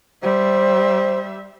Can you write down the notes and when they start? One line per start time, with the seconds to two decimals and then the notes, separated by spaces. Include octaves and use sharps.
0.23 G3 C5 E5